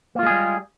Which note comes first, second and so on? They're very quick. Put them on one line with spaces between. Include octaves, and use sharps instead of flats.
A#3 F4 G#3 G#4 G3